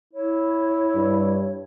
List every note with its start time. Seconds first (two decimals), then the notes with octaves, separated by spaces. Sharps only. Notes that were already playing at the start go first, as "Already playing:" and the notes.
0.13 E4 C#5
0.95 G2